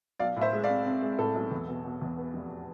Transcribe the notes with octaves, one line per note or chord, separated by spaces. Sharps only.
B1 D5 F5
A2
C5 E5
G#3
D5 F5
C4
C4
G#3
A2 A4
B1
E2
B2
B2
E2
B3
F1